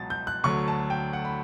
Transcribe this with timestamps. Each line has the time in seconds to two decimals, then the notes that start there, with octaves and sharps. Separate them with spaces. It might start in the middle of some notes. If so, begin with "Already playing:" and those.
Already playing: C#2 B2 F#3 A6
0.10 G6
0.27 F#6
0.44 D2 D3 F#3 A3 C#6
0.68 A5
0.90 G5
1.13 F#5
1.25 B5